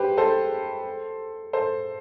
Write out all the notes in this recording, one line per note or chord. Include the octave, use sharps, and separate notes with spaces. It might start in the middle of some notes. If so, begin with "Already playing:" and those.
Already playing: G4 B4 C5
A4 C5
A4 C5